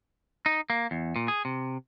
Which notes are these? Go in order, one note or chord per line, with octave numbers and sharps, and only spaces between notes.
D#4
A#3
E2
A#2
G#4
C3